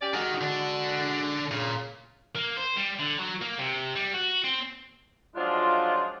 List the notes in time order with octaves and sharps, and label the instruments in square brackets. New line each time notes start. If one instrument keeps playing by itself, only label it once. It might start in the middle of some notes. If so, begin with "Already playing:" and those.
[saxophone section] C#4 G4 D5
[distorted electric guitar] D#3 [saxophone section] G#3 F#4
[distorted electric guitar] D3 D4
[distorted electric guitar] A#2 [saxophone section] C#3
[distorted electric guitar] A#3
C5
G3
D3
F#3
A#3
C3
G3
F#4
C4
[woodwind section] F3 F#3 G#3 D4 D#4 F4